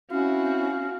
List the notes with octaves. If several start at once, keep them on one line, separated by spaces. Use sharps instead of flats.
C4 C#4 E4 F#4 F5